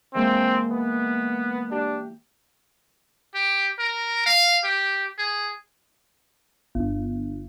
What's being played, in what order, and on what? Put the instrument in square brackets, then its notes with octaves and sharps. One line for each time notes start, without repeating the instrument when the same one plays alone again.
[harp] E3 G#3 A#3 [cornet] C4
[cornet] B3
[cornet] D4 [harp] G4
[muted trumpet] G4
A#4
F5
G4
G#4
[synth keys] G1